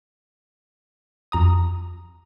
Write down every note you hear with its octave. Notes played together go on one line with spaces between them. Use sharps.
F2 A#5 D#6